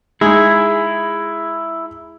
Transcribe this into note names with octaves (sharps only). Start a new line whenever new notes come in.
G#3 D#4 E4 G#4